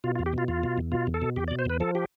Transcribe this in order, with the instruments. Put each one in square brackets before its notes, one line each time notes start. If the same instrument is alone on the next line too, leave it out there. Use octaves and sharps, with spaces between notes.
[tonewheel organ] B2 F4
F4
E2
G4
B2 F4
E2 F4
B2
E2
B2 F4
E2
A4
B2
E2 G4
D5
B2
C5
E2 B4
F3 A4
G4